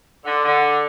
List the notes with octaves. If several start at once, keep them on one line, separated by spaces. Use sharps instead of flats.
D3
D3